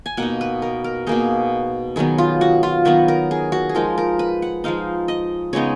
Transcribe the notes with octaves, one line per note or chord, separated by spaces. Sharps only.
G#5
B2 A#3 D#4 F#5
B4
A#4
A#4
B2 A#3 D#4 G#4
D#3 F#3 B3 G#4
F4
F#4
F4
D#3 F#3 B3 F#4
A#4
G#4
F#4
G#4
F3 G#3 D#4 A#4
A#4
B4
F#5
F3 G#3 D#4 F5
D#5
C#3 G#3 B3 D#4 C#5